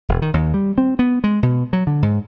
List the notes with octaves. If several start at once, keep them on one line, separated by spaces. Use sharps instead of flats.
E1
D#3
D#2
G3
C4
B3
G#3
B2
F#3
D3
G#2